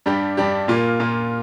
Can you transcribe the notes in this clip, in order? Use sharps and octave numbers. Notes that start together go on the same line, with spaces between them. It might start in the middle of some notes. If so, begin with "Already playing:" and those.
G2 G3 D4 G4
G2 G3 D4 G4
A#2 A#3 F4
A#2 A#3 F4